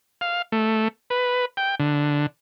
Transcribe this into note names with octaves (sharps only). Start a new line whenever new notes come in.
F5
A3
B4
G5
D3